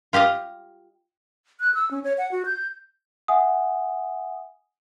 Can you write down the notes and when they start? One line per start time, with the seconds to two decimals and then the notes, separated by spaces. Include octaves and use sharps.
0.13 F4 G4 D#5 F5
1.60 F#6
1.74 E6
1.91 C#4
2.04 C#5
2.18 F#5
2.32 F#4
2.46 G6
3.28 E5 F#5 G#5 D#6